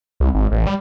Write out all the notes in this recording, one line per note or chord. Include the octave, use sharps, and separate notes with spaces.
C2
G#1
A1
G3